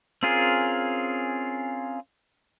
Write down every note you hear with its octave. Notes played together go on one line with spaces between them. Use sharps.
C4 C#4 F4 G#4 A#4